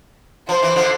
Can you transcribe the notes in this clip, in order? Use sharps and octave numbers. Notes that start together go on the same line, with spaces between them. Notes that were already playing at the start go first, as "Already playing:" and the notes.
F3 C5
E3
D3 F3